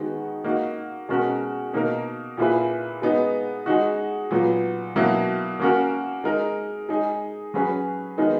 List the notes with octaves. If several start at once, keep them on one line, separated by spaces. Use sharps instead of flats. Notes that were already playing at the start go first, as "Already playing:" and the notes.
Already playing: D#3 G#3 B3 F#4
A#3 D#4 F#4
B2 G#3 C#4 F#4 A#4
B2 A#3 D#4 A#4
A#2 A#3 E4 G#4 B4
G#3 B3 D#4
G#3 D#4 F#4
A#2 F#3 B3
B2 F#3 A#3 E4
A#3 C#4 F#4 A#4
G#3 D#4 A#4
G#3 D#4 G#4
F#3 C#4 G#4 B4
D#3 G#3 B3 D#4 A#4